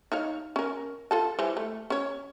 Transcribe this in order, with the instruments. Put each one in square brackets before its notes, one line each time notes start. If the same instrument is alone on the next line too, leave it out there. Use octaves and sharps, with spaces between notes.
[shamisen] D#4 C#5 F5
C#4 A#4
F4 A4 A5
E3 G3 C5
A3
C#4 C#5